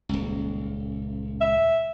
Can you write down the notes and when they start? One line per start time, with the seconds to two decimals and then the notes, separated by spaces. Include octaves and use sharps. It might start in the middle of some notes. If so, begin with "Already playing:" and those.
0.09 D#1 C#2
1.41 E5